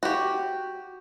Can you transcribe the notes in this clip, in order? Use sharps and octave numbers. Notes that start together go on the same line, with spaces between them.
F#4 G4